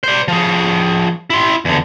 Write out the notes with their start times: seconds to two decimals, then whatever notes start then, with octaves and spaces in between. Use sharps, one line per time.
0.04 C5 D5
0.28 F3 G#4
1.30 E4 C6
1.65 E2 D3